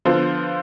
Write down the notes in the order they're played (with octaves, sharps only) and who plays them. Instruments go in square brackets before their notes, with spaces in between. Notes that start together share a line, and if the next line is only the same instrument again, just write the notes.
[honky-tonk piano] D3 F3 B3 F4 C5